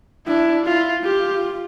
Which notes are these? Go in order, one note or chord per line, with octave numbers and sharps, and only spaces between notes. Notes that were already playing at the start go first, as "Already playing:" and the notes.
D4 E4
E4 F4
F4 G4